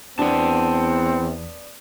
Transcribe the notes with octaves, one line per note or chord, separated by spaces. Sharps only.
E2 B3 C4 D4 F#5 A5